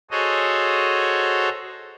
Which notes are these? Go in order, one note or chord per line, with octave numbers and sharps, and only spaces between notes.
F#4 G#4 A4 C5 C#5 D#5